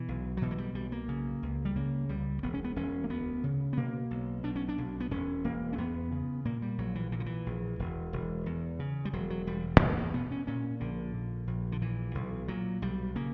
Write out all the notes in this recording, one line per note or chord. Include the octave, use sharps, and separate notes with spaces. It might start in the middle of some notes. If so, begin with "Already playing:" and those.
Already playing: B2 E3
B1
F#3
B2 E3
A#3
G3
B1 G3
A#3
C#3
C#2
G3
C#3 A#3
C#2 G3
E1 B3
C#4
B3
E1 C#4
A#3
D2 B3
C#3
B3
B2 A#3
B1
B2 D4
C#4
D4
B1
B3
E1 C#4
E1 A#3
C#4
E2 B3
C#3
A#2 A#3
G3
A#1 F#3
E3
A#2 E3
D3
E3
A#1
E1
E1
E2
C#3
G3
E1 F#3
F#3
E1 G3
E2 B3
A#3
B2 B3
C#4
A#2 C#4
A#1 D3
A#2
A#1
D3
A#2 E3
B1
A#2 F#3
B1 G3
C#3 A#3